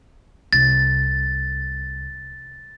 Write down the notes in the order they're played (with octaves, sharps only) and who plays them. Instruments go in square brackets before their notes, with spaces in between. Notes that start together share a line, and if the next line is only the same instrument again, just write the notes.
[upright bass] C2 [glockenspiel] A6